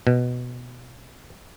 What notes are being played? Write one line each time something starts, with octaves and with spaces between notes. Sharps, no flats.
B2